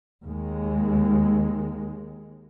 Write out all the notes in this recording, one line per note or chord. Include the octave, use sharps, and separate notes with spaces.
D#2 G#3